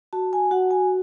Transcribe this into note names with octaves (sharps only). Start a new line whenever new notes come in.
F#4 A5
G#5
F#4 F#5
G#5